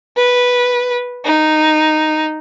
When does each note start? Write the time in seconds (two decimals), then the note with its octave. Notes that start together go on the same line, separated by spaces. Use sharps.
0.17 B4
1.25 D#4